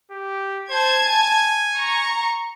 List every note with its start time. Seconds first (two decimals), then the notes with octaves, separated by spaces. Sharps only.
0.11 G4
0.70 C5 A5 G#6
1.03 G#5
1.75 A#5 C#6